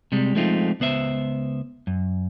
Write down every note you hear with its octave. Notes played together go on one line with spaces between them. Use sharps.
C3 G3 G#3
F3 G#3 A3 C4 D#4 F4
C#2 B3 C5 E5
F#2